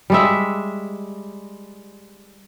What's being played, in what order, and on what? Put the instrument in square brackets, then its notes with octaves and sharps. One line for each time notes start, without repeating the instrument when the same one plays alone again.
[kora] G3 G#3 E5